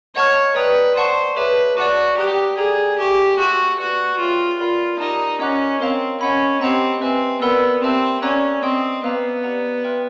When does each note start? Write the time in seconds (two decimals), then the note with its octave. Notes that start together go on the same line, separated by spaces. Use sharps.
0.15 C#5 D#5 F#5 A5 C#6 F6
0.56 B4 D5 G5 A#5 D#6
0.96 C5 D5 F#5 A5 C#6
1.36 G#4 B4 C#5 E5 A5 D6
1.77 F#4 D5 F#5 A5 D6
2.17 G4 F#5 A#5 D#6 F#6
2.58 G#4 A4 D5 G5 A#5
2.98 G4 E5 G#5 C#6
3.38 F#4 E5 A5 C6 E6 G6
3.78 F#4 B4 D5 F#5
4.18 F4 G#4 C#5 E5 G5 C6
4.59 F4 A#4 D5 F#5 B5
4.99 D#4 G4 A#4 D5 F#5 A5
5.40 C#4 D#5 F#5 A#5 D6 F#6
5.80 C4 A#4 C#5 F5 A#5
6.21 C#4 D#5 F#5 B5
6.61 C4 G4 C5 D#5 F#5 A#5
7.01 C4 B4 E5 G#5
7.41 B3 A#4 D5 F#5 B5 E6
7.82 C4 G4 C5 E5 A5
8.22 C#4 D5 F#5 A#5 D6 F#6
8.63 C4 D#5 G5 C6 D#6
9.03 B3 C5 F5 A#5 D6 F6
9.43 G4 B4 D5 F#5 A#5
9.84 B4 E5 G5 C6 F6